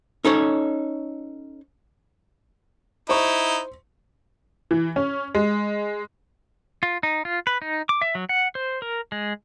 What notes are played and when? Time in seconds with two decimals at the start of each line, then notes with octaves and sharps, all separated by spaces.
0.25 C#4 D#4 A4 C#5
3.09 D#4 E4 C5 C#6
4.71 E3
4.96 C#4
5.35 G#3
6.83 F4
7.03 D#4
7.25 F4
7.47 B4
7.62 D#4
7.89 D6
8.02 E5
8.15 F#3
8.29 F#5
8.55 C5
8.82 A#4
9.12 G#3